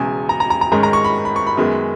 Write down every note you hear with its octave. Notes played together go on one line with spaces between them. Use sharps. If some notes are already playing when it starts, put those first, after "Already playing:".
Already playing: E1 E2 C#3 G#5
A#5
A#5
A#5
A#5
G#2 D#3 G#3 C#4 A#5
A#5
C#6
B5
B5
C#6
B5
F#2 D#3 G#3 B3